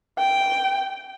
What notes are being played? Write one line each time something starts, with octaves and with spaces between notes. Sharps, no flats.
G5